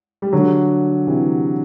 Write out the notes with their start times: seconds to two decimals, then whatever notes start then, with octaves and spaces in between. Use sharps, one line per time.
0.22 G3
0.33 D3 F#3
1.07 C3 E3